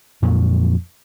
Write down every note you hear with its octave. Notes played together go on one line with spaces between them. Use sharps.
F2 A#2 F3 F#3